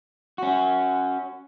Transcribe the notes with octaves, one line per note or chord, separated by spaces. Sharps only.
C#4 F#4